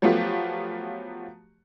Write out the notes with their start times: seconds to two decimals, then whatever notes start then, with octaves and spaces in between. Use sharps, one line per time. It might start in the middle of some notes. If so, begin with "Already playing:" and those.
0.02 F3 F#3 A3 B3 F4 G4